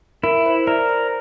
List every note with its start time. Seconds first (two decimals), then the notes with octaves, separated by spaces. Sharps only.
0.23 E4 A#4
0.46 C5
0.67 A#4 D5
0.89 C5